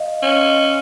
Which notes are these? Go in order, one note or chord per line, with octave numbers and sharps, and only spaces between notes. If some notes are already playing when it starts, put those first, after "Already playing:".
Already playing: D#5 F5
C#4